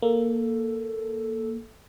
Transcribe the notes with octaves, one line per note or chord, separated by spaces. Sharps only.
A#3 A4